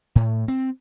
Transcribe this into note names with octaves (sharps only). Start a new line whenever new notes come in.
A2
C4